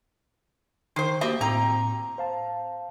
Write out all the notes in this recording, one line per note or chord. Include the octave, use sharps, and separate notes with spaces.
D#3 C5 C6 C7
A#3 F#4 G4 C5 D#5 E5
A2 C4 A#5
C5 F5 A5